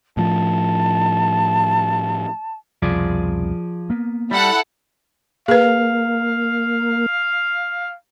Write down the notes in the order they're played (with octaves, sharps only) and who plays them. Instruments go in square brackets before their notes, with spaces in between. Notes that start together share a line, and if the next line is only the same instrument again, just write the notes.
[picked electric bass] A2 F3 [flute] A5
[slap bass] C2 F2 B2 [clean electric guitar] F3 G#4 D5
[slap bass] A#3 B3
[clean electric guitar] G3 [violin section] E4 A4 F#5
[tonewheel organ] A#3 [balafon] G#4 B4 [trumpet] F5